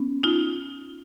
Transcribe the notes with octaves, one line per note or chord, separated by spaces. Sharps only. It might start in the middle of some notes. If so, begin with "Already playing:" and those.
Already playing: B3 C#4
D#4 F4